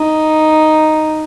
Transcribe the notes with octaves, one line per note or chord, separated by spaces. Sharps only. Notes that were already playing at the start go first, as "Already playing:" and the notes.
Already playing: D#4